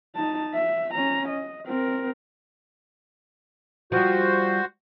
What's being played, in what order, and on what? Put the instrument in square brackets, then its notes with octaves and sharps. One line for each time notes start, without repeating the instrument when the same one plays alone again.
[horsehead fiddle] D#4 A5
E5
C#4 A#5
D#5
C4 A#4
[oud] F3 G3 [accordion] F#4 C5